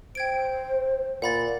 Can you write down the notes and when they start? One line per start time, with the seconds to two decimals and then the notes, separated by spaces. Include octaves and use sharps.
0.15 C5 G5 G#6 D7
1.22 A#2 F#5 B5 A6